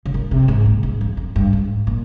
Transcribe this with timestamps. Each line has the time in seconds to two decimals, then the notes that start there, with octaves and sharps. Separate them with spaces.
0.05 C#3
0.14 D#3
0.31 C3
0.48 G#2
0.66 A#2
0.83 G#2
1.01 F2
1.17 F2
1.36 G2
1.53 G#2
1.87 A#2